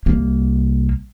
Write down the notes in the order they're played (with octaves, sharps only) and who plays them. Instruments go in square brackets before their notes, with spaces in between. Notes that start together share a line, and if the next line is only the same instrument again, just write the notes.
[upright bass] C2 A#3